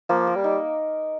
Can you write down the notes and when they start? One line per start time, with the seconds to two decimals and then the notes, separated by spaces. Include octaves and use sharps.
0.09 F3 A#3
0.27 A#4
0.35 G3
0.44 D#4